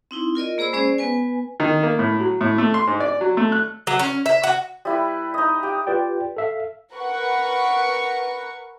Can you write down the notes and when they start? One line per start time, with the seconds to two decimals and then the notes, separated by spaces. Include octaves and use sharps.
0.11 C4 D#4 E4
0.35 F4 A#4 D5 D#5
0.58 A#3 G#4 C5 B5 E6
0.73 G#3 C#4 G#4 C5 D5
0.98 B3 B4 G#5
1.60 D#3
1.83 A#3
1.99 A2
2.20 F#3
2.41 A2
2.58 A3
2.74 C6
2.87 G#2
3.00 D5
3.21 F#3
3.37 A3
3.52 F#6
3.87 F#3
3.99 C#4
4.26 E5
4.44 F#4
4.85 G3 E4 B4
5.34 D#4 D#5
5.63 G4
5.87 F4 G4 B4 D5 G5
6.37 A4 E5 F5
6.94 A#4 B4 F#5 C#6